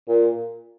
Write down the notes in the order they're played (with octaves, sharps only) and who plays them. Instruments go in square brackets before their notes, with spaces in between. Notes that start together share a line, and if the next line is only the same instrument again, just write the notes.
[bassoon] A#2